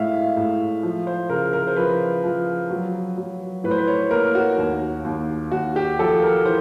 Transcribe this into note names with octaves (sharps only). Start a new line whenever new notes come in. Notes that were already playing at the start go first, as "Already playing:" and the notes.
Already playing: A2 G#3 E5 F5
A2
F3
C5
C#3 A#4
A#4
C5
F3 B4
F3
F#3
F#3
A2 B4
C5
B4
C#5
A#3 A#4
F#4
D#2
D#2
D#2 F#4
G4
F3 A4
A#4
E3 C5